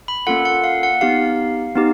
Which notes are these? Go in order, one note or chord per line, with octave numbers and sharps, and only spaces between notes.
B5
A#3 C#4 F4 A4 F#5
F#5
F5
F#5
B3 D#4 G4 F5
B3 D#4 G4